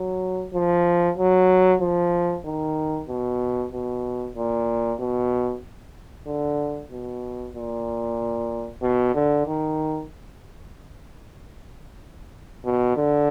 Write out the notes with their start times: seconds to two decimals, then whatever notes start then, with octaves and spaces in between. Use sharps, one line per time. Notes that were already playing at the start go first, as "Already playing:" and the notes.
Already playing: F#3
0.54 F3
1.18 F#3
1.81 F3
2.45 D#3
3.09 B2
3.72 B2
4.36 A#2
5.00 B2
6.27 D3
6.92 B2
7.55 A#2
8.82 B2
9.14 D3
9.47 D#3
12.65 B2
12.96 D3